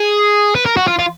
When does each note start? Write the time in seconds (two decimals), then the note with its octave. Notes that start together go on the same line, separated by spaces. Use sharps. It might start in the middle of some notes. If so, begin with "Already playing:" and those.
Already playing: G#4
0.55 B4
0.66 A#4
0.77 F#4
0.87 F4
0.99 F4